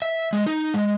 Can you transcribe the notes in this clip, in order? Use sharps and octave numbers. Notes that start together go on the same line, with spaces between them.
E5
G#3
D#4
G#3